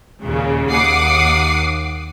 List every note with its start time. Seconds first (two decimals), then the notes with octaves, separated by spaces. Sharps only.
0.21 D#2 A#2 C#3
0.70 D#2 F#5 D6 D#6 C7